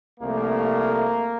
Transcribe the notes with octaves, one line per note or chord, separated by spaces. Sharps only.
C2 C3 F3 A3 A#3